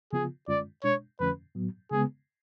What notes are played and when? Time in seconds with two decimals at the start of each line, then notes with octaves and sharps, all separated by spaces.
0.13 C#3 F3 B3 F4 G#4
0.48 F#2 D3 G#3 C#4 F4 D5
0.84 B2 G#3 D4 C#5
1.20 F2 D3 F3 A3 C#4 B4
1.55 A2 F#3 B3
1.91 C#3 G#3 B3 G#4